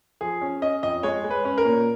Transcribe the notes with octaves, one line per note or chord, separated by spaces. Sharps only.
F3 G#4
C#4
C#4 D#5
F2 D#5
G#3 C#5
G#3
B4
C#4
A#4
A#2